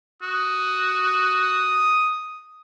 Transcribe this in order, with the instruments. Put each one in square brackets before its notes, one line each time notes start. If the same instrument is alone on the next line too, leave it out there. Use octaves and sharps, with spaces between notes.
[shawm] F#4 [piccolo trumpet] D#6